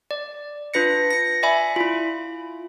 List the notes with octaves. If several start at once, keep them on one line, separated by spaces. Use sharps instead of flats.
D5
D4 F4 B4 A#6 C#7
A#6 C#7
D5 E5 G#5 B5
E4 F4